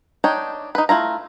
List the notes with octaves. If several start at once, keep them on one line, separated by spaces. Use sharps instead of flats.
D4 D#4 C#5 G5
D#4 B4
A3 E4 F4 A#5